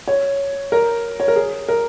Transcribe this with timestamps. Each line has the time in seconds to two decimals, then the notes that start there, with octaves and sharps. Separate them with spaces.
0.08 C#5
0.72 A#4
1.20 C#5
1.28 A#4
1.36 G#4
1.68 A#4